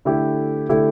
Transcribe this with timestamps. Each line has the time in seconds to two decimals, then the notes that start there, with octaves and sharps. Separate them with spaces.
0.05 D3 A3 E4 G4
0.69 D3 A3 E4 G4